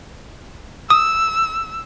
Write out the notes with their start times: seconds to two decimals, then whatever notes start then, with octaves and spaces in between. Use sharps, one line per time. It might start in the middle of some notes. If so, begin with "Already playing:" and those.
0.90 D#6 E6